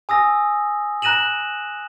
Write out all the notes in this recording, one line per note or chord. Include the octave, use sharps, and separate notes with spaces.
G#5 D#6 E6 A#6
A#5 F#6 A#6 D#7 E7 F#7